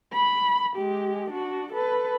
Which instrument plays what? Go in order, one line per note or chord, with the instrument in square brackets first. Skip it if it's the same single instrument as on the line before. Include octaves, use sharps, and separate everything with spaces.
[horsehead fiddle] B5
G#3 G4
D4 F#4
A4 B4